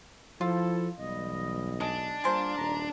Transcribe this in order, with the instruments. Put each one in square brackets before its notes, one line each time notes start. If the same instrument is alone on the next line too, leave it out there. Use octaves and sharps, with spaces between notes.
[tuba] F3 [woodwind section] E4 A4 [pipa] F4
[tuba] B1 [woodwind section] E3 G3 D#5
[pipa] G#3 [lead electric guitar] D4
[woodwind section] G3 A#3 F4 [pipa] G#4 A#4 C5
[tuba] D#1 [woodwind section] A#5